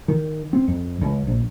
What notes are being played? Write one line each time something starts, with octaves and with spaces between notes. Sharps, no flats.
D#3
C4
F2
C#2
A#1